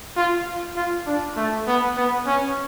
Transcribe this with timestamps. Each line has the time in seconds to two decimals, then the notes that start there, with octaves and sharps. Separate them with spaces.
0.17 F4
0.76 F4
1.07 D4
1.37 A3
1.67 B3
1.97 B3
2.26 C#4